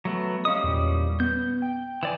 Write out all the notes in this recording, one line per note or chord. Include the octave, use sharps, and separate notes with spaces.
F#3 A3 B3
G3 C#4 D#5 F5 D#6
E2 A#2
B3 G6
G5
E3 D5 G#5